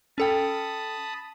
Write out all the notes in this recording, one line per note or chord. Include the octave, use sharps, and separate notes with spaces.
C#4 A4 G5 A5 B5 D#6